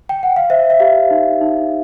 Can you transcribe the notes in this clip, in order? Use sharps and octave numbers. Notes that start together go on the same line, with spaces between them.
G5
F#5
F5
C5 E5
E5
G4 F5
D#4
D#4